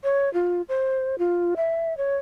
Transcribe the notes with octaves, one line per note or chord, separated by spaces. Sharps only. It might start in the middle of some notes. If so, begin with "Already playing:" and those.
C#5
F4
C5
F4
E5
C#5